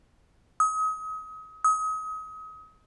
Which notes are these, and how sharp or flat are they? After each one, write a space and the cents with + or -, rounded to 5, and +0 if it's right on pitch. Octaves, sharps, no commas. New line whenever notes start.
D#6 +35
D#6 +35